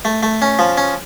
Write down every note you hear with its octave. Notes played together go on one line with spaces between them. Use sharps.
A3
A3
C#4
F3
C#4